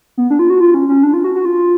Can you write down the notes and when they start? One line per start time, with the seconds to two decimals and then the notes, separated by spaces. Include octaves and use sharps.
0.18 B3
0.30 D4
0.39 F4
0.50 F#4
0.60 F4
0.74 C#4
0.89 C#4
1.03 D4
1.14 F4
1.24 F#4
1.35 F#4
1.45 F4